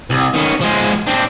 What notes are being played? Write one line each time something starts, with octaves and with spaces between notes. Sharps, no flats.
C2
D#3 C#4
F3 G#3
C4 D4